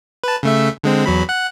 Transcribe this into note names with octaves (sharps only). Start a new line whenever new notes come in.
B4 A5
C#3 A3 E5
D3 G#3 C4
E2 F#3 B5
F#5 F#6